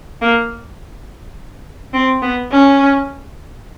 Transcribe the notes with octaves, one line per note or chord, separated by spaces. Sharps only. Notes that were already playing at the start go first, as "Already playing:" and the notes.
A#3
C4
B3
C#4